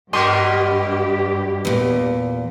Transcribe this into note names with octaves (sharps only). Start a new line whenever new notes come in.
G2 B2 F#4 G4 A#4 D#5 C6 C#6
E2 A#2